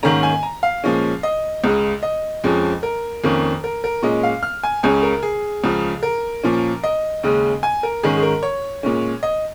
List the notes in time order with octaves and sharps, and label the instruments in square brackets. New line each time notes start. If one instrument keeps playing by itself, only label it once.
[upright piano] G#2 D#3 A#3 C#4 A#5
G#5
A#5
F5
A#2 F3 G#3 C#4
D#5
C#2 C#3 G#3
D#5
F2 F3 G#3 C#4
A#4
F2 D#3 A#3 C#4
A#4
A#4
A#2 G#3 C#4 D#5
F5
F6
G#5
C#2 C#3 G#3 C#4 G#5
A#4
G#4
C#2 C#3 F3
A#4
A#2 F3 C#4
D#5
D#2 C#3 G#3 C#4
G#5
A#4
G#2 D#3 G#3 C#4 G#4
G#4
A#4
C#5
A#2 G#3 C#4
D#5